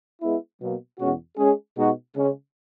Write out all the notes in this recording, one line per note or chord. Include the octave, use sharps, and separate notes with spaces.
G#3 B3 E4
B2 F#3 A#3
E2 B2 G#3 C#4 F#4
G#3 C#4 G#4
B2 G#3 D#4 F#4
C#3 G#3 C#4